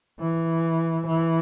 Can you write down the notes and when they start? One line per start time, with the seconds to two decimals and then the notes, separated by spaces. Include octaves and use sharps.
0.20 E3
1.07 E3